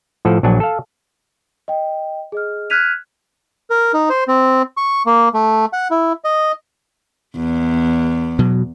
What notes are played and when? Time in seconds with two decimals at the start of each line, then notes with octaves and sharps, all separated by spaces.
0.25 A2 F3 A4 F#5
0.43 A#1 F#3 D4 F#5 G#5
0.60 A4 F5
1.68 D#5 G5
2.32 G#4 D#5 F6
2.70 F6 F#6 G#6 B6 D#7 F7
3.70 A#4
3.94 D#4
4.10 C5
4.28 C4
4.77 C#6
5.06 A#3
5.34 A3
5.73 F#5
5.91 E4
6.24 D#5
7.36 E2
8.39 B2 F#3